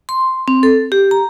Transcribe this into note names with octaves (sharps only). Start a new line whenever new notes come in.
C6
C4
A4
G4
A#5